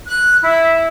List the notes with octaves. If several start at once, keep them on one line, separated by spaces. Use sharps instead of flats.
F#6
E4